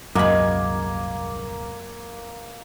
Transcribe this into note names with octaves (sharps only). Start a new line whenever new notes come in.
D#1 C2 F#2 G#3 A#3 G#5 B5